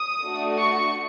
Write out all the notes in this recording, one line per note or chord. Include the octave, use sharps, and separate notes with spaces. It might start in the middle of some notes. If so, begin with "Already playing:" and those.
Already playing: D#6
A3 D4 F#4 A4
C#6